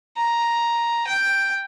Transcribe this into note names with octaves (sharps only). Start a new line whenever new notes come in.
A#5
G5